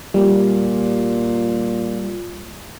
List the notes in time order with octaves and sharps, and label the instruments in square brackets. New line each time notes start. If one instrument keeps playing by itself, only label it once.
[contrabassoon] A#2 [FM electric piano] G3